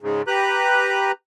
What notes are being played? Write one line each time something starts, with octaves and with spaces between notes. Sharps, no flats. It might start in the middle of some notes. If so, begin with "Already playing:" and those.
G#2 C#3
G4 B4 A#5 F#6